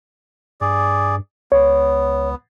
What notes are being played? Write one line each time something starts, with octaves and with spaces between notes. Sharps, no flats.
G2 G#4 D5
C#2 B3 C#5